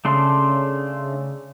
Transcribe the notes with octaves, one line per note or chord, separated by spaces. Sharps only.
C#3 A3 D4 C6